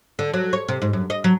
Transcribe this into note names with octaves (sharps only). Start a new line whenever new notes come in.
D3
F#3
C#5
C3
G#2
F#2
D#5
F#3